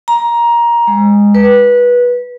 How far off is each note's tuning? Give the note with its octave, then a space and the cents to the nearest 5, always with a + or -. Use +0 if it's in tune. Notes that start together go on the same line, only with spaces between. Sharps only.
A#5 +15
G#3 -20
B4 -20